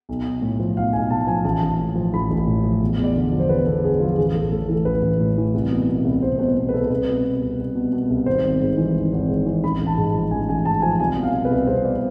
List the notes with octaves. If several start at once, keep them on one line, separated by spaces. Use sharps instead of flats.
B1
B1
A2
F3
B1 F5
B1 G#5
A2 A5
F3 G#5
A1 A5
A1
A2
F3
A1 B5
A1
A2
F3
E2
E2
D5
D3
F3
C5
E2 B4
E2 A4
D3 G#4
F3 F4
A1 G#4
A1 A4
A2 A4
E3 A4
A1 B4
A1
A2
E3
C2
B2
B2
C2
C2 C5
B2 C5
B2
B4
C2 A4
A4
C2 B4
B2
B2
C2
C2
B2
B2
C2
G#1 C5
G#1
G#2
E3
G#1
G#1
G#2
E3
A1 B5
A1
A5
G#2
F3
A1 G#5
A1 G#5
G#2 A5
F3 G#5
C2 G#5
B2
F5
B2
B4
C2
C2 C5
B2 D5